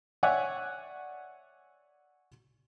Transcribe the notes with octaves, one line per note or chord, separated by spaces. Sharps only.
C#5 D5 E5 F#5 G#5